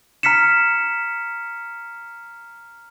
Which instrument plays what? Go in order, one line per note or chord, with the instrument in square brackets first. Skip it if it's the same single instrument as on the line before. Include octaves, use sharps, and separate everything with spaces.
[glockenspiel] A#5 F6 B6 C#7 E7